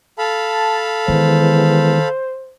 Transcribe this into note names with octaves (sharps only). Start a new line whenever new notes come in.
A4 F5 A5 B5
D#3 E3 G#3 B3 C5